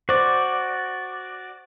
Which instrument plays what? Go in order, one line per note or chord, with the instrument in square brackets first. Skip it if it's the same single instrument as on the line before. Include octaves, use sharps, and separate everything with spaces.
[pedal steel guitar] F#4 D5 [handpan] C5